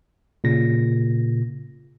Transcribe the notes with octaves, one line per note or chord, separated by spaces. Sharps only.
A#2 C#3 A#6